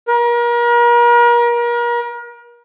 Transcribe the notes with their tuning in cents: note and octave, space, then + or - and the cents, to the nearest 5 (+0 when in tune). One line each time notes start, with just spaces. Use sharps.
A#4 +35